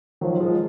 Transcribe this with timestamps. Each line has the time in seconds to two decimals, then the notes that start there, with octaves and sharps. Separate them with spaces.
0.21 D#3 F3 F#3
0.40 F3 G#3